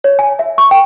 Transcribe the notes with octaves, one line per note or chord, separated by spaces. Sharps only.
C#5
G#5
E5
C#6
G5